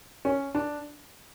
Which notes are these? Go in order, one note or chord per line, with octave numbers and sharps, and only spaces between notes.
C#4
D4